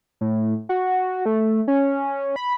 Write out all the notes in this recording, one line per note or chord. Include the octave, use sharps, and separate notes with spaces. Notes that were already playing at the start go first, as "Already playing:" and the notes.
A2
F#4
A3
C#4
B5